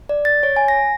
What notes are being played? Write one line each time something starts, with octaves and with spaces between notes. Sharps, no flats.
D5
A6
C#5
G#5
A#6